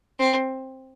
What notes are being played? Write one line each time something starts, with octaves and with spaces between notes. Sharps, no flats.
C4